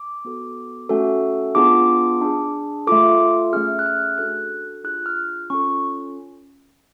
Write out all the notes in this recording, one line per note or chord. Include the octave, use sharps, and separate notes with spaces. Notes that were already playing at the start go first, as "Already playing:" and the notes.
Already playing: D6
B3 F#4 A4
A3 C#4 F#4 A4
B3 D4 F4 G#4 D6
D4 G#4
A3 F4 A4 D6
A3 C#4 G#4 F6
F#6
F6
D4 F#4 A4 F#6
D4 F4 G#4 F#6
F6
C#4 F4 A4 C#6